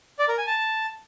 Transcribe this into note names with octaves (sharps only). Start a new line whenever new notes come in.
D5
A#4
G#5
A5